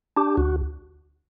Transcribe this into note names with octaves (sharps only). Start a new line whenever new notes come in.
D4 G4
D2 F#4